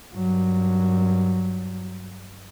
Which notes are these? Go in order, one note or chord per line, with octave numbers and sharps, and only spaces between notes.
G2 F#3